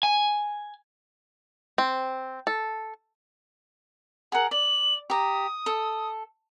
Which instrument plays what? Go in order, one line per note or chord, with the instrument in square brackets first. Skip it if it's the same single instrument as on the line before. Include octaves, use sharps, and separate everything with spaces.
[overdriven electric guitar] G#5
[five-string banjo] C4
A4
[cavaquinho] G#4 A#4 [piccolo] F#5
[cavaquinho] D5 [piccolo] F#7
[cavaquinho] G4 A#5 [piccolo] D#6
[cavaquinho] A4